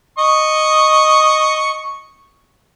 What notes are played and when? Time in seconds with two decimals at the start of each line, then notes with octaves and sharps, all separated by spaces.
0.18 D#5 C#6